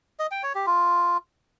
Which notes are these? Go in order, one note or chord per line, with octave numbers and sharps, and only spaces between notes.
D#5
G5
C#5
G4
F4